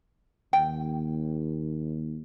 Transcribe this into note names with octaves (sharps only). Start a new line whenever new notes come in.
D#2 G5